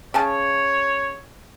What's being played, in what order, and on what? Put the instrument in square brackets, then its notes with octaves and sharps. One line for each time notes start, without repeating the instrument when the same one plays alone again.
[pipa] C#3 G#5 A5 [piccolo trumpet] C#5